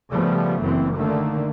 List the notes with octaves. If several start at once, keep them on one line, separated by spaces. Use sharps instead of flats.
C#3 F3 G3 A3 B3
F#1 F#2 E3 C4
D3 D#3 A3 A#3